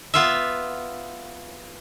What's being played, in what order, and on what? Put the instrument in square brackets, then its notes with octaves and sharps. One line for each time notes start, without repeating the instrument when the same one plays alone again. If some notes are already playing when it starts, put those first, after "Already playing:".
[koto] B3 F4 E5